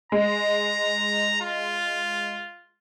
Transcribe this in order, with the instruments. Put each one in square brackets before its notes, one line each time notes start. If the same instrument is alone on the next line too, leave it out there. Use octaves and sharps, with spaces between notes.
[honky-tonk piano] G#3 [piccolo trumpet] A#5
[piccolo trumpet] F4